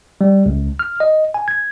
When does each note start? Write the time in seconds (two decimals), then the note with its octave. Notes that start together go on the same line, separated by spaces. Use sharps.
0.21 G3
0.46 C#2
0.79 F6
1.00 D#5
1.34 G#5
1.48 G#6